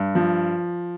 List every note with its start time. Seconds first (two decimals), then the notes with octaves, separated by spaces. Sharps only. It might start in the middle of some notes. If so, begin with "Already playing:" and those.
Already playing: G2
0.15 F3